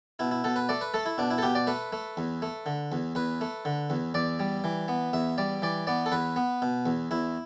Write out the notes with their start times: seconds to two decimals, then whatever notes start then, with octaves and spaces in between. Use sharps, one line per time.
0.19 B2 E4
0.31 E4
0.44 B2 A4
0.56 B4
0.69 A3 D5
0.81 B4
0.94 A3 A4
1.06 E4
1.18 B2 D4
1.31 E4
1.38 A4
1.42 B2 G4
1.55 D5
1.67 A3 B4
1.92 A3
2.17 E2
2.42 A3
2.66 D3
2.92 E2
3.15 E2 B4
3.41 A3
3.65 D3
3.90 E2
4.14 E2 D5
4.40 G3
4.64 E3
4.88 B3
5.13 E2 E5
5.38 G3 D5
5.62 E3 D5
5.87 B3 D5
6.06 A4
6.12 E2 B4
6.36 B3
6.62 B2
6.86 E2
7.11 E2 E4